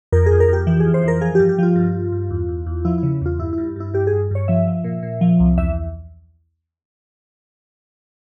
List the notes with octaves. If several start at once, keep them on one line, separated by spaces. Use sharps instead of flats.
F2 A#4
F2 G#4
A#4
F2 G4
E3 G4
F2 G#4
C5
E3 A#4
F3 G#4
G2 G4
G4
F3 F4
G2
G2
G2
E2
E2
E2
F3 E4
C#3 E4
E2 F4
G2 E4
G2 E4
G2 E4
G2 G4
G#4
G2
G2 C#5
F3 E5
F3
A#2
A#2
F3
C2
E2 E5